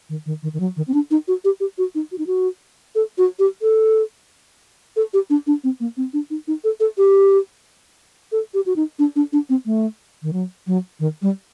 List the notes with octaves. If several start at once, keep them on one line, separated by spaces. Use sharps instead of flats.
D#3
D#3
D#3
D#3
F#3
D#3
C4
D4
D#4
F#4
G4
G4
F#4
D#4
F#4
D#4
F#4
A4
F#4
G4
A4
A4
G4
D4
D4
C4
A#3
C4
D4
D#4
D#4
A4
A4
G4
A4
G4
F#4
D#4
D4
D4
D4
C4
A3
D#3
F#3
F#3
D#3
G3